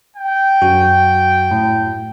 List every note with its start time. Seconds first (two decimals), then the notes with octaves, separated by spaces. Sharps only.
0.17 G5
0.62 F#2 F#4
1.51 A2